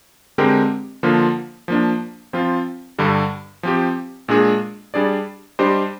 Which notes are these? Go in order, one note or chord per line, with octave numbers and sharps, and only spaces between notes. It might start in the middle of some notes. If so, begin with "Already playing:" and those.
D3 G#3 C4 G4 A#4
D3 F3 A#3 F4
F3 A#3 D4
F3 C4 F4
G2 D3 G3
F3 C4 G4
A#2 G#3 D4 G#4
G3 D4 G#4 D5
G3 D4 G4 C5 D#5